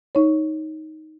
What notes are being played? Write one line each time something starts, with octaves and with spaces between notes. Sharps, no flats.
D#4 C#5